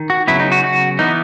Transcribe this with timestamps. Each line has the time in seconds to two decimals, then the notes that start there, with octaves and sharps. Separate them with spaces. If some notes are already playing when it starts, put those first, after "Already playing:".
Already playing: D#3
0.10 F#4
0.27 C#3 F#3 B3 E4
0.40 D#4
0.52 F#4
0.64 F#4
0.99 E3 B3 D#4